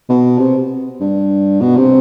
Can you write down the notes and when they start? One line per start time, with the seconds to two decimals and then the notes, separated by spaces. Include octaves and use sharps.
0.09 B2
0.39 C3
1.01 G2
1.61 B2
1.77 C3